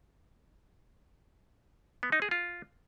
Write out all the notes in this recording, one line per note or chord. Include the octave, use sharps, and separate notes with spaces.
B3
D#4
G#4
F4